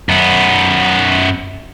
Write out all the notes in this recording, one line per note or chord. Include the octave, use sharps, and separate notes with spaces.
F#2 B3